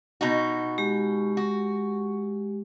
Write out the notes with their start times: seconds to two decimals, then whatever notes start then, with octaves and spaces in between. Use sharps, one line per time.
0.21 B2 D#4 F#4
0.78 G#3 G4
1.37 F#4